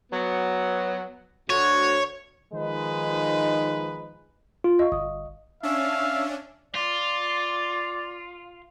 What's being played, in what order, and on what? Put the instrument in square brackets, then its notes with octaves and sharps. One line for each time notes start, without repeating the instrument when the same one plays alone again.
[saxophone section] F#3 B3
[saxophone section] D2 F#4 [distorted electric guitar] C#5
[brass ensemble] D#3 F3 G#3 D#4 B4
[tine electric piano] F4
[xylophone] D#5 F5 C#6
[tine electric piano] G1 [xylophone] D#6
[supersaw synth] C#4 D4 [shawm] E5 [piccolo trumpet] F5
[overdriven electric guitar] F4 [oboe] D5